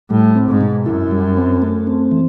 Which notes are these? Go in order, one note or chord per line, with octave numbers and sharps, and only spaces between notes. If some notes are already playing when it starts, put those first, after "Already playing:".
A2 G3
C4
G#2
B2
F#2 E4
G3
C4
A3
C4
E3